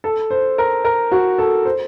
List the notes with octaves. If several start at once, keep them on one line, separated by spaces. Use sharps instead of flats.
A4
C5
A#4
A#4
F#4
A4
C5